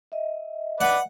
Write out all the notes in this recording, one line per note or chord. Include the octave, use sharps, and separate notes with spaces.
D#5 E5
B4 D5 F#5